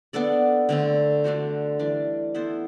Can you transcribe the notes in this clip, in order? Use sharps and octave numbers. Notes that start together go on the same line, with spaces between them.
B3 D4 A4 D5
D3 A3 C4
A3 D4 F#4 C5
E3 G3 D4
B3 E4 A4 C5